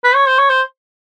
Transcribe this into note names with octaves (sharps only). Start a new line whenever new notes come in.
B4
C#5
C5
C#5
C5